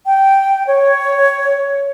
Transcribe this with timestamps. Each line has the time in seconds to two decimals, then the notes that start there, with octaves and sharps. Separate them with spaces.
0.06 G5
0.67 C#5